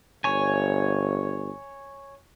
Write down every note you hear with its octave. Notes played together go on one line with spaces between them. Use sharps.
G1 C#5 G#5